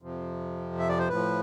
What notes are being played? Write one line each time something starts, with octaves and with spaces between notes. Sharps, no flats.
F2 C3 F3
E5
D5
C5
A2 F3 B4